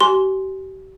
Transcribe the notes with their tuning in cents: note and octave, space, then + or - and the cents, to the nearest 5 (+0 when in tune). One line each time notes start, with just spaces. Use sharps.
G4 -40 G#5 +0 C6 +0